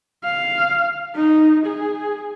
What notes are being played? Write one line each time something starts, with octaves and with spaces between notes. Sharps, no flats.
F5
D#4
G#4